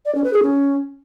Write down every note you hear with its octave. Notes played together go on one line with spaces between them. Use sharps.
D5
C#4
B4
G#4
C#4